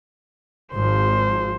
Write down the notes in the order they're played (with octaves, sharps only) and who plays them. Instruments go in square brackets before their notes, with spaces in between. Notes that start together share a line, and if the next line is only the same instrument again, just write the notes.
[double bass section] G#1 F3 [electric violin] C5